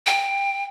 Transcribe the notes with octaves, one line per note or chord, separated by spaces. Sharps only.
G5